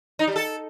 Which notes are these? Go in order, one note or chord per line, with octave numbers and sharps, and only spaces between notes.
D#4
G3
A4